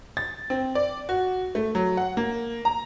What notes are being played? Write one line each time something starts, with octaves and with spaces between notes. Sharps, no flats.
A6
C4
D5
F#4
A3
F#3
F#5
A#3
A#5